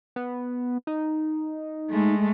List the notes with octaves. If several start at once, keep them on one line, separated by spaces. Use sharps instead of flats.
B3
D#4
G#3 A3